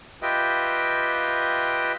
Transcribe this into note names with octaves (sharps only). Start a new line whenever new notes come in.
F4 G4 B4 D#5 E5 G5